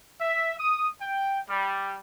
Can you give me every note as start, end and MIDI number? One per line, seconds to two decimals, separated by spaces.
0.21 0.57 76
0.58 0.87 87
1.01 1.40 79
1.49 1.98 55